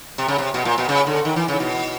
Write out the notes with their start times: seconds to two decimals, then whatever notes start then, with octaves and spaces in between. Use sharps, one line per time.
0.18 C3
0.28 C#3
0.38 C3
0.54 B2
0.65 A#2
0.78 B2
0.89 C#3
1.07 D3
1.25 D#3
1.36 E3
1.48 C#3
1.60 B2